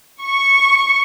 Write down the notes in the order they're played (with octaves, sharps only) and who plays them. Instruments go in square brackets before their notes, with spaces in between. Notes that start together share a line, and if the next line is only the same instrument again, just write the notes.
[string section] C#6